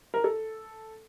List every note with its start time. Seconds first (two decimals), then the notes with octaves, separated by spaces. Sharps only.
0.14 A#4
0.24 A4